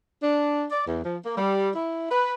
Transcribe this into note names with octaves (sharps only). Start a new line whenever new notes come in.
D4
D5
E2
F3
A#3
G3
E4
B4